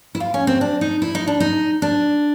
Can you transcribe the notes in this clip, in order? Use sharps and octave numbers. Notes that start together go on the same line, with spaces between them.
E4
F4
C#4
C4
D4
D#4
E4
D#4
D4
D#4
D4